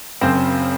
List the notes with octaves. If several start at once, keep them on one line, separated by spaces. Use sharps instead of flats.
F#1 F#2 C#3 C4 C5